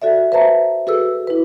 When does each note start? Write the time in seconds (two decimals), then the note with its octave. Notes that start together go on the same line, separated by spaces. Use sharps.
0.02 F#4 A4 D5 E5
0.32 B4 C5 E5 A5 A#5
0.87 F#4 G#4 A4 B4 E6
1.27 E4 B4